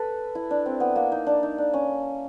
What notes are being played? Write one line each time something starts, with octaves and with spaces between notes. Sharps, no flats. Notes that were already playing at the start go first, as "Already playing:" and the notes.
Already playing: A4 B4
E4
D4
C4
B3
A#3
D#4
D4
D#4
D4
C#4